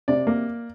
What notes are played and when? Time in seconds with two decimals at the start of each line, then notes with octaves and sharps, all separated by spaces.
0.08 C3 D5
0.27 A#3